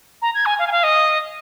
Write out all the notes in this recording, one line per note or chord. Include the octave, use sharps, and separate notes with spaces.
A#5
G#6
G#5
F5
G#5
F5
D#5